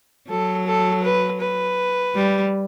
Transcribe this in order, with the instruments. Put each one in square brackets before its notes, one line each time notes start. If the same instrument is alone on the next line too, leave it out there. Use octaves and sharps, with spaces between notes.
[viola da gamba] F#3 [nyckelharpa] A4
[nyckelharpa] A4
B4
B4
[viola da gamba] G3